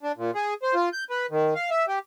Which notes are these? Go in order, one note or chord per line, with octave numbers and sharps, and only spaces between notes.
D4
A#2
G#4
C5
F4
G6
B4
D#3
F5
E5
G4